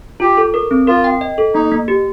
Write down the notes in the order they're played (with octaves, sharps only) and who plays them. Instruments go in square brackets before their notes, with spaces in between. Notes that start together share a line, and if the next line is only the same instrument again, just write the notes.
[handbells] F4 [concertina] G4
[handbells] A4
A#4
C4
[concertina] F4 [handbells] A#4
[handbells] G5
D#5
A4
[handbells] A#3 [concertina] D#4
[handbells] A#3
G4